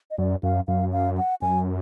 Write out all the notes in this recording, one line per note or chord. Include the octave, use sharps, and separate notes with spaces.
D#5
F#2 D5
F#2 F5
F#2 F5
F5
F#5
F#2 G#5